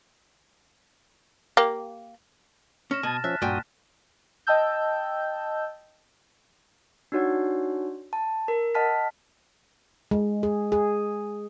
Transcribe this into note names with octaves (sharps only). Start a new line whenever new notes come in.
A#3 G4
C#4 F6 A#6 E7
B2 A5 D#6 G#6 A6
F3 C#4 E5 F#6 A6 B6
G2 A#2 F#4 G5 G#5 D#6
D#5 G5 A5 E6 G6
D4 D#4 F#4 C#5 F#5
A5
A#4
D#5 F#5 A5 F6 B6
G#3
G#4
G#4